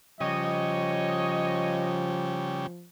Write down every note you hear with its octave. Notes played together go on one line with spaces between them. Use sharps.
C#3 F3 G3 C#5 D#5